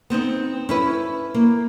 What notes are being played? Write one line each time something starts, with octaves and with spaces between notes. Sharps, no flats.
B3 C4 D4 D#4
C#4 E4 B4
A#3